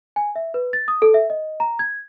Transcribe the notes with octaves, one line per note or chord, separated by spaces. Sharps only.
G#5
E5
B4
A6
D#6
A4
E5
D#5
A#5
G#6